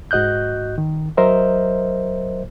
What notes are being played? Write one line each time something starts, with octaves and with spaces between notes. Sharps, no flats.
G#2 F#4 D#5 F#6 G6
D#3
F#3 A#4 C5 D#5 E5